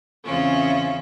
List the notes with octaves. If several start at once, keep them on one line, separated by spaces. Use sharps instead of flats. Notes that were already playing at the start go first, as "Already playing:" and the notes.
E2 C#3 C4 C#4 F4 E5